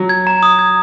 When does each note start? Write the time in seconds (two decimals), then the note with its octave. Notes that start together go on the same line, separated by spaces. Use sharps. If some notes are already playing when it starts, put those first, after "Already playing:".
Already playing: F#3
0.09 G#6
0.27 A#5
0.43 D#6
0.59 G#6